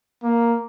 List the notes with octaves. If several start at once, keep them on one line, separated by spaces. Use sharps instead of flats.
A#3